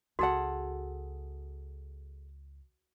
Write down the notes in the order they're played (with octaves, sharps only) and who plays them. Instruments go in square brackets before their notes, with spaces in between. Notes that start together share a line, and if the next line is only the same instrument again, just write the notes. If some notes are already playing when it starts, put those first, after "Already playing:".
[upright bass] C#2 [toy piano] F#4 [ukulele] G#4 A4 F#5